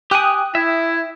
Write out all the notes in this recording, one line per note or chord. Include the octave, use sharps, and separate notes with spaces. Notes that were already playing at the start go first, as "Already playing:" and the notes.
G4 G5 G#5 D#6 F#6
E4 E5